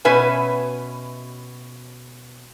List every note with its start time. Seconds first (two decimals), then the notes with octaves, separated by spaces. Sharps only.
0.05 B2 C#4 B4 E5 G#5